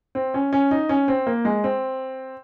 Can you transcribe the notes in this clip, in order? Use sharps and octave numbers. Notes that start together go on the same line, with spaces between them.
C4
C#4
C#4
D#4
C#4
C4
A#3
G#3
C4